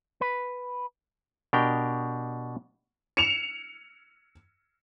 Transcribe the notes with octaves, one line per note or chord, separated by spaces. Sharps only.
B4
B2 D4 G4 A#4 G5
C#7 E7 F7